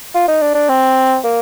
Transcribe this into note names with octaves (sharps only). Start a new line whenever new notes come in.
F4
D#4
D4
D4
C4
A#3